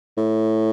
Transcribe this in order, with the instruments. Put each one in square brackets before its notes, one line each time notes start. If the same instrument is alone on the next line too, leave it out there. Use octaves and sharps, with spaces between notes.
[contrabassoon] A2